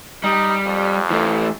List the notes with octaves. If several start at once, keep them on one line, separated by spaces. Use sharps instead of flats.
G3 D#4
F2
E3 A3